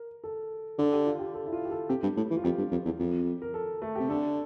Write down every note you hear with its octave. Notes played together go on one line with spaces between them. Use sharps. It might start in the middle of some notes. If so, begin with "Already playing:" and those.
Already playing: A#4
A4
D3 A4
G4
F4
G4
A4
E4
F4
G4
A4
C3 G4
G2
A2
E3
F4
F2 G4
G2
F2
E2
F2
A#4
A4
A3
C3 G4
D3 A4